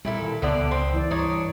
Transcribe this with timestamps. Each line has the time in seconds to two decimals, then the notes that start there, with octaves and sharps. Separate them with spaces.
0.05 A#2 G3 E4 A4
0.22 D#3
0.42 C#2 D3 B3 D5
0.71 C4
0.92 E3 E4 D5
1.11 G2 D4 D#4 C#5